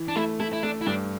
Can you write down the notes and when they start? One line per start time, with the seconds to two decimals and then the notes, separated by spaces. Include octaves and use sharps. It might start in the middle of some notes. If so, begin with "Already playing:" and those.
Already playing: E3
0.08 D4
0.16 A3 E4
0.40 A3 E4
0.53 E4
0.63 A3 D4
0.81 E4
0.86 G2 D4